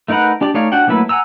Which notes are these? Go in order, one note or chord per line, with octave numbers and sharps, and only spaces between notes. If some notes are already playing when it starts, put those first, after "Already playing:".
A3 D#4 A#4 B4 F#5
D4 G4 D5 D6
A3 D#4 C#5 D5 F5
D4 F#4 F#5 G5
F#3 A3 A#3 E4 B4
F#5 G#5 A#5 E6